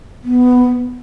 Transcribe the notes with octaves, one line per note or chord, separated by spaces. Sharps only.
B3